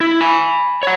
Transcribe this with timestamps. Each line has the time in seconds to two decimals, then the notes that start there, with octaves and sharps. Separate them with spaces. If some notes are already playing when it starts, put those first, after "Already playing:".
0.01 E4
0.21 G#5 B5
0.83 C#5 F#5